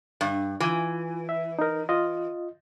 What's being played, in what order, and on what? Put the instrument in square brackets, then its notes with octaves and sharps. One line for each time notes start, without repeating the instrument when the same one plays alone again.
[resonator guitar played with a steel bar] G2
[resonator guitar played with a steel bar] E3 [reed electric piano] F4 G#5
[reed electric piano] E5
D#4 A#4
F4 D#5